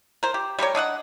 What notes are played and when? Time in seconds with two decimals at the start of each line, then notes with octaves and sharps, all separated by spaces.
0.23 A#4 C5
0.34 G4
0.59 G3 G4 A#4 C#5
0.75 D4 D#5 F5 F#5